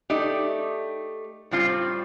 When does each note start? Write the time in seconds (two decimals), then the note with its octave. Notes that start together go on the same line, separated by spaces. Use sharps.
0.10 A3 D#4 G4 D5
1.51 A2 G3 C4 F4